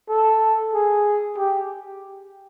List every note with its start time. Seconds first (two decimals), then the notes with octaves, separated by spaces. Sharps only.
0.09 A4
0.74 G#4
1.38 G4